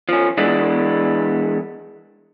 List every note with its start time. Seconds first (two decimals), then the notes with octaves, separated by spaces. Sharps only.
0.09 F3 C#4
0.37 E3 G#3 B3 D4 E4